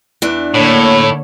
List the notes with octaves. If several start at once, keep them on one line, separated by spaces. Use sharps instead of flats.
E2 E3 D4
A2 D3 A#3 C#5